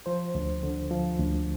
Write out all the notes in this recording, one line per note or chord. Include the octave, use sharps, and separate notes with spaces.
F3 C5
D2
D3
F3
D2